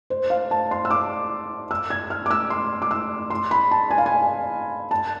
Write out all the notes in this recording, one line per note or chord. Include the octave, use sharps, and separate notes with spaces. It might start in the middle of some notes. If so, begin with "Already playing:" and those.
C5
F5
A5
C6
E6
D6
E6
G#6
F6
D6
E6
C6
D6
E6
C6
B5
A5
G#5
F5
G#5
A5